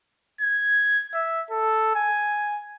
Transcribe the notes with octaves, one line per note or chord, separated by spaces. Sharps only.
G#6
E5
A4
G#5